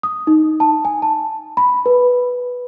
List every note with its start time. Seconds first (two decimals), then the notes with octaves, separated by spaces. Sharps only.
0.03 D#6
0.27 D#4
0.60 A5
0.85 G#5
1.02 A5
1.57 B5
1.86 B4